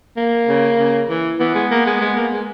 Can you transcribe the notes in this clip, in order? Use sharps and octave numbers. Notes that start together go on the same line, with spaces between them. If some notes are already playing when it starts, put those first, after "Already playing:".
A#3
C#3
C#3
E3
E3 B3
G#3
A#3
G#3
G#3
A#3
G#3